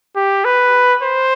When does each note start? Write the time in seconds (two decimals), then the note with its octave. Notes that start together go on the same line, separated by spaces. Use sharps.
0.16 G4
0.45 B4
1.03 C5